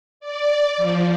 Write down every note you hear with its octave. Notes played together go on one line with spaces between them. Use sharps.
D5
F3